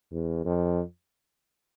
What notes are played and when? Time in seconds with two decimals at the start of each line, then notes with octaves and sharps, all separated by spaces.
0.11 E2
0.45 F2